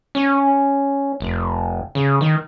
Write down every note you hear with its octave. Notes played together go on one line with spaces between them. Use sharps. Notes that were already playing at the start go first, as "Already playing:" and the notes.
C#4
F1
C#3
D#3